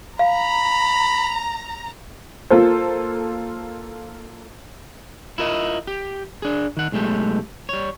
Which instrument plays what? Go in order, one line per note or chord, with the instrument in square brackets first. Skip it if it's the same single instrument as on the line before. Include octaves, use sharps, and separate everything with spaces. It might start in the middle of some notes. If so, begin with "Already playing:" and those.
[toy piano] F5 [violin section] A#5 [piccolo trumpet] B5
[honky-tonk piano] A#3 F4 A4 C5
[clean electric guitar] E4 F4 A#4 D#5
G4
D4 G#4
D#3 F#5
B1 G#3 A3 G4
G3 C#5